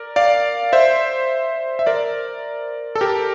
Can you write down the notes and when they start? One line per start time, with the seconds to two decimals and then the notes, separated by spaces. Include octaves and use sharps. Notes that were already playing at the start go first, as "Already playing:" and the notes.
Already playing: A#4 D5
0.16 D5 F5
0.73 C5 E5
1.79 E5
1.87 A#4 D5
2.95 A4
3.01 G4 A#4